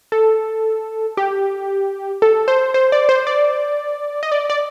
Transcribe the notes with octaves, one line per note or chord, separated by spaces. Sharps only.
A4
G4
A4
C5
C5
D5
C5
D5
D#5
D5
D5